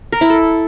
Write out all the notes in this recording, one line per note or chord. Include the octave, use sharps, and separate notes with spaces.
A#4
E4
A4